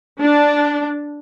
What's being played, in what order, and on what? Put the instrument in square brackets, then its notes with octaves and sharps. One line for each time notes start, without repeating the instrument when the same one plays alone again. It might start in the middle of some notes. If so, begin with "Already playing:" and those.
[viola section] D4